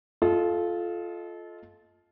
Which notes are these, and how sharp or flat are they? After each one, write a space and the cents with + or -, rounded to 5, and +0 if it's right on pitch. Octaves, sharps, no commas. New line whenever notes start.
F4 +0 A4 -25 D#5 +15